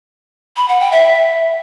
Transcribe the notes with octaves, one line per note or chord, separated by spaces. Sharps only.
B5
F#5
G5
E5